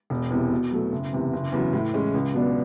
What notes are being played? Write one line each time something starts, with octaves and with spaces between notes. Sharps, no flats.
E1
E2 C3
B2
F#3 A3
F#1
E2 C3
F#1
E2 C#3 F#3
A2
E3 G#3 C#4
C#2
B2 F#3 B3 D4